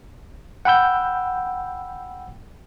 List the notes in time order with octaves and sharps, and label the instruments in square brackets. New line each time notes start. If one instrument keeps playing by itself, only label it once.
[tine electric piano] F#5 G5 B5 E6 G6